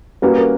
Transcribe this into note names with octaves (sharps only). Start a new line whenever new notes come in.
G3 A#3 C#4 F#4 B4
A#4